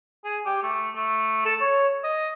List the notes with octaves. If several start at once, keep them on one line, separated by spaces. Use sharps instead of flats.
G#4
G4
A3
A3
A4
C#5
D#5